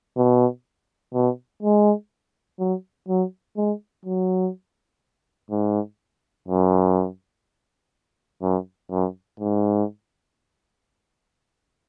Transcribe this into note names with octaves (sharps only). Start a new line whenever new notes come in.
B2
B2
G#3
F#3
F#3
G#3
F#3
G#2
F#2
F#2
F#2
G#2